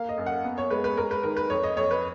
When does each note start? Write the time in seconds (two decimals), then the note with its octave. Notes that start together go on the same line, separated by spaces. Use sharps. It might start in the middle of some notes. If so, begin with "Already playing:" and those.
Already playing: A#3 F5
0.09 D#5
0.18 F#2
0.26 F#5
0.44 B3
0.58 C#5
0.71 G#3 B4
0.84 B4
0.97 G#3 A#4
1.11 B4
1.23 D#3 A#4
1.37 B4
1.50 F2 C#5
1.63 D#5
1.77 F2 C#5
1.91 B4